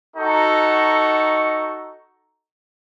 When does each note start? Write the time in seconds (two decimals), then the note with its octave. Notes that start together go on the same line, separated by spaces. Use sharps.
0.16 D#4 F#4 A4 A#5 C#6